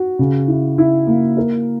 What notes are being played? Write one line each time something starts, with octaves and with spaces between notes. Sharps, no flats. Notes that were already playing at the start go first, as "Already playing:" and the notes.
Already playing: F#4
C#3
E4
E4
A#3
A#4